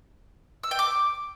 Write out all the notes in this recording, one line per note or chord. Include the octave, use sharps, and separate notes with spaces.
E6
G5
D6